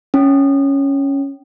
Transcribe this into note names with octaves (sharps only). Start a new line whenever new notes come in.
C#4